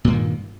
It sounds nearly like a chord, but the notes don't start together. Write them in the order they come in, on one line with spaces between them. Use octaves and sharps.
A#2 G2 A#3 D#3